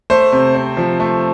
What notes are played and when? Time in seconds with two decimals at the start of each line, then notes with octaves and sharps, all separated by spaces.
0.10 A3 C5
0.32 C3
0.55 C4
0.77 F3
1.00 A3